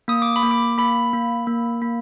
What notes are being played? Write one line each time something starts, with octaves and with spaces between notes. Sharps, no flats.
A#3 D#6
D6
B5
A#3
D6
A#3 B5
A#3
A#3
A#3